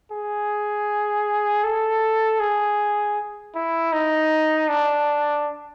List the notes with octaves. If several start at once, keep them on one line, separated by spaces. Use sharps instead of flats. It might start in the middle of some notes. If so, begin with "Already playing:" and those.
G#4
A4
G#4
E4
D#4
D4